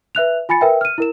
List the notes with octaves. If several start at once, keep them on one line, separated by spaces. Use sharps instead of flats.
B4 E5 F#6 F7
F4 G#5 B5 A6 C#7
A#4 B4 E5 G5
F6 D#7
E4 A#4 E7